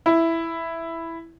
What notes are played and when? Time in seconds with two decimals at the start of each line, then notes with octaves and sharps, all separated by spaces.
0.06 E4